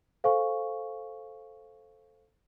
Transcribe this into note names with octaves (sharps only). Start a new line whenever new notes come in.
A4 C5 F5 G#5 C#6